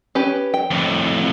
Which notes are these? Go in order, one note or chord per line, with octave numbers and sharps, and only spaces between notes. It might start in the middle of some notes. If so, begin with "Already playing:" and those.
C#4 G4 B4
G5
F2 A2